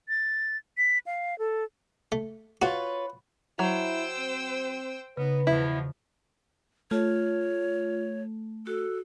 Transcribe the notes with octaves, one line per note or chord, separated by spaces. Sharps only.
A6
B6
F5
A4
A3
F4 F#4 B4 C#5
F#3 E4 C5 G5 E6
C4
C#3 B3 D#4 B4
E2 B2 F3 E4
A3 F4 C#5
F#4 A4